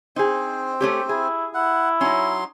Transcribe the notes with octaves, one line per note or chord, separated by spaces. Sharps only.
C4 D#4 G#4 C5
A3 C#4 G4
E4 G#4
E4 F#5
F#3 C#4 D#4 C6